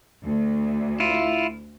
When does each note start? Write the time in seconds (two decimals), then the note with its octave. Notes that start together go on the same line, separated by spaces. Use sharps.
0.24 D2
1.00 E4 F4